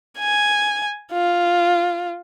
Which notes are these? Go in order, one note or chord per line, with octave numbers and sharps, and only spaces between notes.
G#5
F4